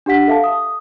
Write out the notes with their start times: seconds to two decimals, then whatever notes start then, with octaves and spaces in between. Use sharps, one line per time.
0.06 D4 G4 F#5 B6
0.28 A4 E5 F5 A5
0.44 D#6